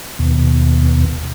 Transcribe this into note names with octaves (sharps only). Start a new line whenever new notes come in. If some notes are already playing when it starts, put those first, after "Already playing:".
D#2 B2